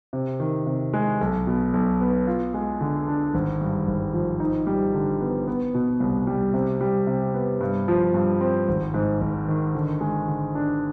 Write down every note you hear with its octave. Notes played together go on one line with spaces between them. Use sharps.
C3
D#3
C3
G#3
B1
B2
B1
B3
F4
G#3
D3
D4
G#1
G2
G#1
F3
D#4
G3
D3
B3
B3
B2
C2
G3
C3
G3
C3
B3
G2
F3
G2
C4
G#1
G#2
G#1
D#3
D3
G#3
D3
D4